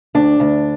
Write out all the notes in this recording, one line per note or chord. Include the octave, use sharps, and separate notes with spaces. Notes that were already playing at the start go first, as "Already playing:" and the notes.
D2 D4
D2